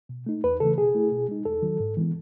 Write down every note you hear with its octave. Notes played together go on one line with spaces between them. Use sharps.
B2
A3 D#4
E2 B4
C#3 E3 A3 A4
B2 G#4
A3 E4
B2
G#3 D#4
E2 A4
D#3 F#3
G#2
E3 G#3 B3